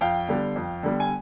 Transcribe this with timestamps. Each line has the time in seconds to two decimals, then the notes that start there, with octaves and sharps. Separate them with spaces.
0.01 F2 F5 G5
0.28 D3 G3 B3
0.56 F2
0.83 D3 G3 B3
1.00 G#5